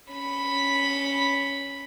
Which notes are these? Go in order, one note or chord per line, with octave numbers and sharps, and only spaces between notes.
C#4 B5